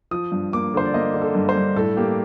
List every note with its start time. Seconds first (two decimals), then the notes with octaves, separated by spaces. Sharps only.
0.11 F3 D#6
0.32 G2
0.53 A#3 D6
0.74 D3 C5
0.85 D5
0.94 A#3 D#5
1.14 D3
1.21 A4
1.35 G2
1.49 C5
1.56 G2
1.76 A2 A4
1.97 A#3 G4